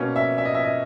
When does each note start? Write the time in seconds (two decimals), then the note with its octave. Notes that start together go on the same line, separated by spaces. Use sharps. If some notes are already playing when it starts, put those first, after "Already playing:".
Already playing: B2 A#3 C#4 C#5
0.16 E5
0.38 E5
0.45 D#5
0.55 E5
0.64 D#5